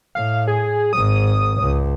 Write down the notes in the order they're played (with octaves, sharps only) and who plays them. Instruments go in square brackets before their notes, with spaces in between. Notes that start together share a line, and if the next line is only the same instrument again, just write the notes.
[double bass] A2 [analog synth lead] F5
[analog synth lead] G#4
[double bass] G#1 G#2 [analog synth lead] D#6
[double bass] C#2